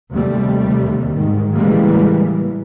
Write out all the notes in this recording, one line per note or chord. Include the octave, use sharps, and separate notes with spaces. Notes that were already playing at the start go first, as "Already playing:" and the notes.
D#2 C3 G3 A3
G#2 D#3
A2 C#3 E3 G3 G#3 A#3